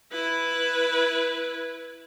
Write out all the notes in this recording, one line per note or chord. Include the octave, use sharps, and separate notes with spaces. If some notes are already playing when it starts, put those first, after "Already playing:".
E4 B4